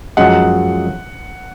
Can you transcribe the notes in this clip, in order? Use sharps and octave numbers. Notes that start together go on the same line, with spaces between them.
F#2 F3 G#3 D#4 F#5